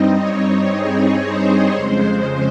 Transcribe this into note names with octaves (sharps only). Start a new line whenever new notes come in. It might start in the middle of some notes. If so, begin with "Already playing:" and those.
Already playing: G2 G3 C4 D#4 D#5
C#5
G#4
C5
F2 C#3 G#3